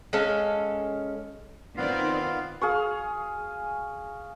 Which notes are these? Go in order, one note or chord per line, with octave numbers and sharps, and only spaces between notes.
G#3 C#4 A4 F5
D#3 B3 C4 F4 D5 F5
G#4 F5 C#6